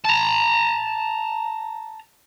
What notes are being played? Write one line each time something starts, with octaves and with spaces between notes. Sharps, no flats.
A5 A#5